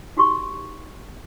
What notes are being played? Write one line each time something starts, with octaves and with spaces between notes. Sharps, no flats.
D#4 F#4 G4 C6 C#6